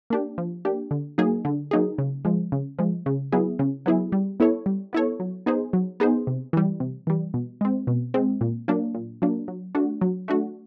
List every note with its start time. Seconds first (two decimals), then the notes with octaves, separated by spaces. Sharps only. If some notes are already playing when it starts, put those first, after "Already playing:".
0.10 A#3 D4 G4
0.38 F3
0.65 A#3 D4 G4
0.91 D3
1.18 F#3 A#3 D#4 G#4
1.45 D3
1.71 F#3 A#3 D#4 G#4
1.98 C#3
2.25 F3 G#3
2.52 C#3
2.79 F3 G#3
3.06 C#3
3.32 F#3 B3 E4 G#4
3.59 C#3
3.86 F#3 B3 E4 G#4
4.12 G3
4.40 B3 E4 A4 C#5
4.66 G3
4.93 B3 E4 A4 C#5
5.20 F#3
5.46 B3 D#4 G#4 C5
5.73 F#3
6.00 B3 D#4 G#4 C5
6.27 C3
6.53 E3 G3
6.80 C3
7.07 E3 G3
7.34 B2
7.61 G#3 C4
7.87 B2
8.14 G#3 C4
8.41 A#2
8.68 F#3 A#3 D4
8.95 A#2
9.22 F#3 A#3 D4
9.48 F#3
9.75 A3 D4 F#4
10.01 F#3
10.28 A3 D4 F#4